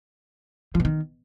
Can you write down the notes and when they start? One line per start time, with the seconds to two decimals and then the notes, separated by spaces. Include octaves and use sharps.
0.75 F3
0.80 B2
0.85 D#3